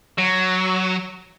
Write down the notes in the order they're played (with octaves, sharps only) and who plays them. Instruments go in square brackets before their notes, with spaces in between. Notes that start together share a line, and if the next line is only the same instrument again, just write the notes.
[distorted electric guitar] F#3